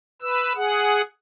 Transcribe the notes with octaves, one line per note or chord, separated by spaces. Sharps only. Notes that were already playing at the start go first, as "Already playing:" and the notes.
B4 E6
G#4 F#5